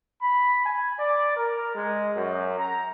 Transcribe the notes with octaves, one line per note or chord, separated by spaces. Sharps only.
B5
G#5
D5
A#4
G#3
F#2
A#5